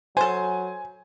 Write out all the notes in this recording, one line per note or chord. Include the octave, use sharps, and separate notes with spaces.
F#3 A4 C5 G#5